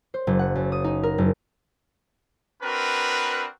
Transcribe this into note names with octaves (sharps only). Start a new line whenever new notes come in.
C5
F#1
F#5
F#2
D#6
D#4
A#4
F#1
C4 D4 F#4 A#4 B4